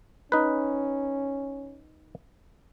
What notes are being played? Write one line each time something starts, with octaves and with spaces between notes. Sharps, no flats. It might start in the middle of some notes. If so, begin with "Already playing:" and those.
C#4 D#4 B4